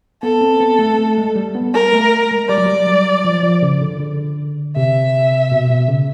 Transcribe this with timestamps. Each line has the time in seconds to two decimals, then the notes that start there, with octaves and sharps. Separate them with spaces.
0.23 B3 A4
0.41 C4
0.60 B3
0.79 A3
0.99 A3
1.18 G#3
1.36 G3
1.55 B3
1.74 A#4
1.93 A3
2.31 G#3
2.49 G3 D5
2.58 F#3
2.66 G3
2.87 F#3
3.25 F3
3.43 F3
3.62 C#3
3.81 D3
4.00 D3
4.76 C3 E5
5.52 B2
5.70 B2
5.89 C#3